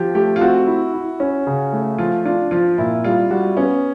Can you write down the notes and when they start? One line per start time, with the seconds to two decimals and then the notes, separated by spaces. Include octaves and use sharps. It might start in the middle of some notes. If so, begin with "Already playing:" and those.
Already playing: F3 G4
0.15 A3 G4
0.36 F4
0.41 C4 F#4
0.67 E4
0.94 E4
1.20 C#4
1.47 C#3
1.73 A3
1.98 F3 F4
2.25 D4 F4
2.51 F3 F4
2.78 A#2 E4
3.04 G3 F4
3.30 G3 F#4
3.57 B3 C#4